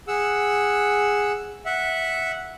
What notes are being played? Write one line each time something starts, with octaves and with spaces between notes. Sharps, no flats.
G#4 F#5 E6
E5 F#5